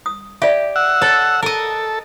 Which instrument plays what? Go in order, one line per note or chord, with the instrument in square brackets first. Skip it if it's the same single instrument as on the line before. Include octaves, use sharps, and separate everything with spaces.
[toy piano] D#6
[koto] G4 [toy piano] D5 E5
[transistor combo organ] F#5 E6
[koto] A4 [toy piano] C#5
[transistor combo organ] A4 [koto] A#4 D#5